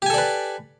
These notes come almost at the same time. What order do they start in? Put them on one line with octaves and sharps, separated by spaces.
G4 G#5 A4 D5 B4